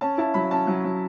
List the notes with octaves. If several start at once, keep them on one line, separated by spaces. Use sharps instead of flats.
C#4 A5
E4 A5
F#3 B5
C#4 A5
F#3
F#3